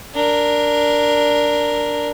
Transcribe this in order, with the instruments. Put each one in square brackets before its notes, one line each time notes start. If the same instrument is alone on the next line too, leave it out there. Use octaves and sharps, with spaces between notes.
[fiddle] D4 A#4